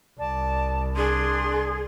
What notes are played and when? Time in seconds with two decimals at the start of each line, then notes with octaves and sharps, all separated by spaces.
0.19 C2 D5 A5
0.97 D4 G#4 C6